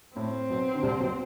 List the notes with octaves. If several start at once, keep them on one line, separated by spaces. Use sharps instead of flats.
A2 C4
B1 B2
D3
C2 C3
B1 B2